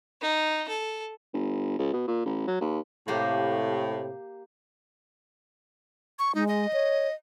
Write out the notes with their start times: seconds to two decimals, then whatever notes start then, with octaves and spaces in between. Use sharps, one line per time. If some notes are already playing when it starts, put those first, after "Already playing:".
0.22 D#4
0.69 A4
1.33 G1
1.79 C#2
1.93 B2
2.08 A#2
2.25 A1
2.47 F#3
2.61 D#2
3.08 A2 C3 A#3 G4
6.19 C#6
6.35 G#3 D#4
6.48 D#5
6.73 C#5